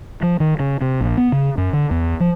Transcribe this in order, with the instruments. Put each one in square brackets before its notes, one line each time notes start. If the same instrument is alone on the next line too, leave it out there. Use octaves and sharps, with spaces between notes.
[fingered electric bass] F3
D#3
C#3
C3
A#1
B3
C#3
F#2
D3
E2
F3